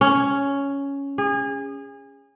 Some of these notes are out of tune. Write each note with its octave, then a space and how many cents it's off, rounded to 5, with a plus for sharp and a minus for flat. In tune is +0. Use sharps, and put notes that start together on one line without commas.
C#4 +5
G#4 -30